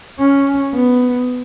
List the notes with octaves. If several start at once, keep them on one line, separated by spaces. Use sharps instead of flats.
C#4
B3